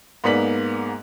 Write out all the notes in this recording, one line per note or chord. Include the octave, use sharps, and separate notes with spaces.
G#2 A#3 B3 D5 B6 F#7